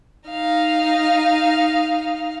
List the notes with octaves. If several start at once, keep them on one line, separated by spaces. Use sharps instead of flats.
D#4 F5